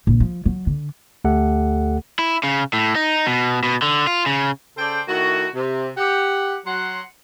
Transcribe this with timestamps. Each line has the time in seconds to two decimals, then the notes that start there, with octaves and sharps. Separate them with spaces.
0.07 A#1
0.20 F3
0.45 F#3
0.67 D3
1.24 D2 A3 G4 A4 F#5
2.19 E4
2.43 C#3
2.73 A2
2.95 D#4
3.26 B2
3.63 B2
3.82 D3
4.07 F4
4.26 C#3
4.78 C#3 A4 C5 D5 G5
5.08 D#3 A3 E4 F#4
5.55 C3
5.98 G4 F#5
6.66 F#3 F#5 C6